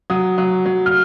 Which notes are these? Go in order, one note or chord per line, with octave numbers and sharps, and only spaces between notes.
F#3 D#6
F#3
F#3
F6